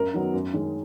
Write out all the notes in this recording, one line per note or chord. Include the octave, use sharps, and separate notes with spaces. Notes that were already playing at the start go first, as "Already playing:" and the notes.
Already playing: F#2 A#4
D#3 F#3 B3
F#2
D#3 G#3 C#4